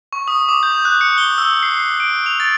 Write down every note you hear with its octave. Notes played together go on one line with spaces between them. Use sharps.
C#6
D#6
D6
G6
F#6
C#7
G7
E6
C7
D7
F7
A6